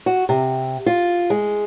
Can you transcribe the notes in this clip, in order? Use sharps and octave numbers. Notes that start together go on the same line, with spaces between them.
F#4
C3
F4
G#3